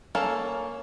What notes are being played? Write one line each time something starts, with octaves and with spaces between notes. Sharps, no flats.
A#3 C#4 A4